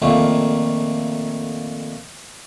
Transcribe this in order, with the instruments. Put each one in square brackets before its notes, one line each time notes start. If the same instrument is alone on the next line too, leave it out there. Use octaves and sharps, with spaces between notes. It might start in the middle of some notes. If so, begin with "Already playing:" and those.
[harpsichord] F2 A#2 D#3 A3 A#3 F4